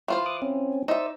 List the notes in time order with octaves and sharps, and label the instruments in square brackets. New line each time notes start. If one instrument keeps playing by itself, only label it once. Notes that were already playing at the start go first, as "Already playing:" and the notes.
[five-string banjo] E3 F4 C5
[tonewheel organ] D6 D#6 F#6
C4 C#4
[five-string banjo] D#4 E5 [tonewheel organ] C5 D5 E6